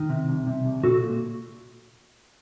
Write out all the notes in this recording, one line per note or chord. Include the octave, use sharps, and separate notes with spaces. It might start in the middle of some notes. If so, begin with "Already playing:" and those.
Already playing: D#3
C3
C2
C3
C2
A#2 F#4 A4
A#2